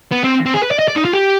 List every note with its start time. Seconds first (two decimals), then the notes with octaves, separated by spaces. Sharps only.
0.11 B3
0.23 C4
0.46 C4
0.54 G#4
0.63 B4
0.71 D5
0.79 D#5
0.88 D5
0.96 D#4
1.05 F4
1.13 G4